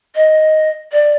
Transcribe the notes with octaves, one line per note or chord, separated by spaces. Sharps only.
D#5
D5